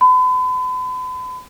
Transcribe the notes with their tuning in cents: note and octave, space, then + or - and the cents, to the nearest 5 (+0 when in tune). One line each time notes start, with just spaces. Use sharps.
B5 +40